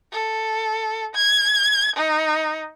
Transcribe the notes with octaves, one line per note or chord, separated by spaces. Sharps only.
A4
G#6
D#4